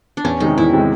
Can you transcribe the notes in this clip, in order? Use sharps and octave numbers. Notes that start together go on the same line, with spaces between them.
D4
E2 C#4
C3 D#3 G#3 D#4
E2 E4
C3 D#3 G#3